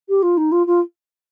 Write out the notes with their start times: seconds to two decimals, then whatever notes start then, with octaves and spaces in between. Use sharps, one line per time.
0.09 G4
0.22 F4
0.37 D#4
0.52 F4
0.67 F4